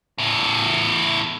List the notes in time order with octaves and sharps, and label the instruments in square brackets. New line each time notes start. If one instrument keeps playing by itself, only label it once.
[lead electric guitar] E2 A2